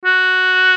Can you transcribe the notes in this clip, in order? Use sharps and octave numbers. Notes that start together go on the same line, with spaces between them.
F#4